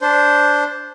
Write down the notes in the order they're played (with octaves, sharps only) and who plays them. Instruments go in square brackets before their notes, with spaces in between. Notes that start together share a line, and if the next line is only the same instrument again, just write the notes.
[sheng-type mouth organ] D4 C5